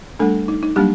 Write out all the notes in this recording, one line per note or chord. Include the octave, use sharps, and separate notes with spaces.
G3 A3 D4 A4
D#4
D#4
F#3 G3 A#3 D4 G4